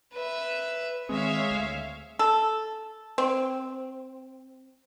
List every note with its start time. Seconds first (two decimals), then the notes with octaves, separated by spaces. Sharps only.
0.13 B4 E5
1.09 D#3 G#3 C4 C#5 E5 F5
1.51 D2
2.19 A4
3.18 C4